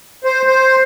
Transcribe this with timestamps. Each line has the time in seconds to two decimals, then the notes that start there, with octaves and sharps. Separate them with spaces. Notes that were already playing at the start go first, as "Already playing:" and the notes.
0.24 C5
0.46 C5